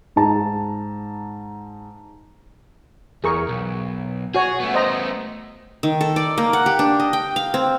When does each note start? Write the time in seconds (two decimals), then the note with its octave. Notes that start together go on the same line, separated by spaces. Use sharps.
0.16 G#2 A5 A#5
3.24 E2 G#4 A#4 C#6
3.48 B1
4.34 F#4 G#4 C#5
4.60 A3 B3
4.74 C5 D#5 A#5
5.83 D#3
6.01 A4
6.16 D5
6.38 A#3
6.53 F#5
6.66 G4
6.79 D4
7.00 D#5
7.13 G5
7.36 F5
7.54 C4